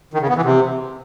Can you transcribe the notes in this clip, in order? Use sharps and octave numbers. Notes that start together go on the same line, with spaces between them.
D#3
C#3
B3
E3
C3